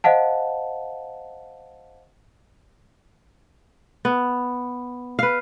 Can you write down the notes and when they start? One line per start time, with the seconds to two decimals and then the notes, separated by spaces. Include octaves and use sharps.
0.04 C5 D#5 F5 F#5 A5
4.05 B3
5.19 B4 F5